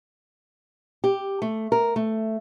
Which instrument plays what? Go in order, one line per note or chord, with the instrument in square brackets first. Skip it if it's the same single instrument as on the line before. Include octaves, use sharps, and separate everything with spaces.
[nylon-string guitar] G4
A3
A#4
A3